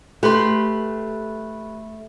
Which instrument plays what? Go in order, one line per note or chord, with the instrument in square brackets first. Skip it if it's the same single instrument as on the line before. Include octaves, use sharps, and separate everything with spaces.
[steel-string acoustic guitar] A3 [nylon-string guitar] G4 [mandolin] B4 B5 C6